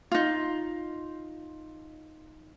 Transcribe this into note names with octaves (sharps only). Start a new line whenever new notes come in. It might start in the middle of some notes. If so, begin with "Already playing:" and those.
D#4 F4